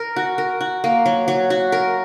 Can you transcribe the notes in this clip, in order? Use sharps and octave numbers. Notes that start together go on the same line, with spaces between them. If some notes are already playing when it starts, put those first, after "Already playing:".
Already playing: A#4
F#4
A#4
F#4
A#3
F#3
F#3
F#4
A#4